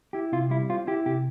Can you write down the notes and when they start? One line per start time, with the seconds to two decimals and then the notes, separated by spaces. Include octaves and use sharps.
0.13 E4 G4
0.32 C3 F4
0.50 G3 E4
0.70 C4 F4
0.87 E4 G4
1.06 C3 G4